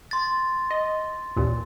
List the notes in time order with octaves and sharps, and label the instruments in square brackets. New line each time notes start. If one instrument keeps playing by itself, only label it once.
[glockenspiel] C6 A6
[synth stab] D#5
A1 D#2 A#2